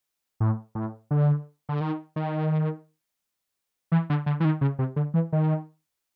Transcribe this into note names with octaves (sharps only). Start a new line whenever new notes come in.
A2
A2
D3
D3
D#3
D#3
E3
D3
D3
E3
D#3
C#3
C3
D3
E3
D#3